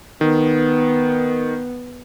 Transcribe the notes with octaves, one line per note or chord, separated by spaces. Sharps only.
D#3 B3